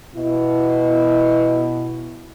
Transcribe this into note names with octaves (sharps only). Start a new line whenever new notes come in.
B2 E4